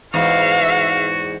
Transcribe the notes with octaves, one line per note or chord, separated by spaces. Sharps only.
E2 G#2 F#4 F5